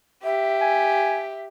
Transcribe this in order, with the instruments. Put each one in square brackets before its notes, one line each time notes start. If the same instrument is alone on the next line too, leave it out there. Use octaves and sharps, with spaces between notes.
[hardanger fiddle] G4 [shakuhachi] E5
[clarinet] G#5